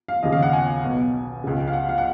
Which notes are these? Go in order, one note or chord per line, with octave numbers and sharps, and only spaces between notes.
F5
D#2 C#3 D#5
F5
F#5
G#5
B1 B2
C#2 C#3
F5
F#5
F5
F#5